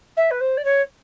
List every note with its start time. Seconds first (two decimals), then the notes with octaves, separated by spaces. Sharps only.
0.17 E5
0.31 B4
0.40 C5
0.57 D5
0.64 C#5